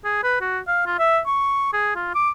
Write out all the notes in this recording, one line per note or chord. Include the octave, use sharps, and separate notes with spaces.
G#4
B4
F#4
F5
F4
E5
C#6
G#4
F4
D6